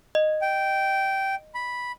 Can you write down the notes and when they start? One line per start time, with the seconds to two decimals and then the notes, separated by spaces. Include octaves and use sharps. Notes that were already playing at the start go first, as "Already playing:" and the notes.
0.15 D#5
0.42 G5
1.55 B5